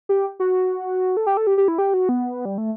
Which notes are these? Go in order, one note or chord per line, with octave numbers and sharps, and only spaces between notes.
G4
F#4
A4
G4
A4
G4
G4
E4
G4
F#4
B3
G3
A3